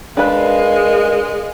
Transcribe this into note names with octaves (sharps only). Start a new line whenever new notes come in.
G#3 D4 A#4 B4 F5